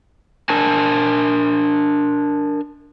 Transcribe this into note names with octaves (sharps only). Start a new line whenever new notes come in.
D4 A#4 G#5 A5